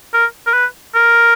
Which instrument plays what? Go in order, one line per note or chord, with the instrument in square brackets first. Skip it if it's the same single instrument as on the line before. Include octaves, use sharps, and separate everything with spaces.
[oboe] A#4
A#4
B4
A#4